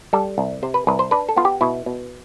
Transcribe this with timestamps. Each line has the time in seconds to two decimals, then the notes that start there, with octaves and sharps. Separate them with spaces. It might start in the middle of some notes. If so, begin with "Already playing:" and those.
0.13 G3 A4
0.38 C2
0.63 C3 C5
0.74 B4
0.87 C2 B4
0.99 C5
1.11 D4 B4
1.29 A4
1.36 B3 F4
1.45 G4
1.61 B2 E4
1.86 B2